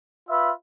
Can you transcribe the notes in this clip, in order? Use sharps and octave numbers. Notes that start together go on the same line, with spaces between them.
F4 B4 E5